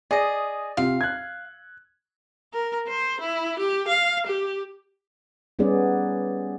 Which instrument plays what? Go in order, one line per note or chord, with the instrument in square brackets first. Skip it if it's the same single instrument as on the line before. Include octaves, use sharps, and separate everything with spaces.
[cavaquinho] G#4 D#5 [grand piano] D5
[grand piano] C3 F4 [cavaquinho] F5
[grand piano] F#6 G#6
[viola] A#4
C5
E4
G4
F5
G4
[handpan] G3 B3 C#4 D#4 G#4 D5